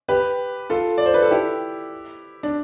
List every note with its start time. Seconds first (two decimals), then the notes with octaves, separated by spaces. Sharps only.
0.08 G4 B4
0.70 F4 A4
0.98 D5
1.06 C5
1.14 B4
1.22 A4
1.31 E4 G4
2.43 D4